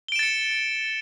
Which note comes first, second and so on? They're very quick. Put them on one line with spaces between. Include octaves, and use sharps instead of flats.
G7 D7 E7 A6 C#7